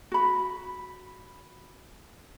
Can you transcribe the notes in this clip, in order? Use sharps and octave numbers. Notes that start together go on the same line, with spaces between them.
F#4 B5